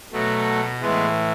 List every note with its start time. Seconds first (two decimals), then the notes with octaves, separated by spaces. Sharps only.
0.13 B2 F#3 A3
0.81 A2 E3 G#3 B3